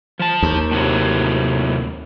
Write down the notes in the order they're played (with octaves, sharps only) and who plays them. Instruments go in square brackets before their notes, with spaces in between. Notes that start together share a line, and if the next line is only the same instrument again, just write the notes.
[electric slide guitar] F3 A5
[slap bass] D#2
[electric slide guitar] A2 C3 F#3